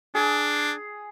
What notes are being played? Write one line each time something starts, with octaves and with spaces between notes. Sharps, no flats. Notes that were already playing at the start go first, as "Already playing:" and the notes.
D4 G#4